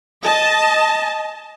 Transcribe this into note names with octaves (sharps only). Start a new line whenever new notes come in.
D#5 A5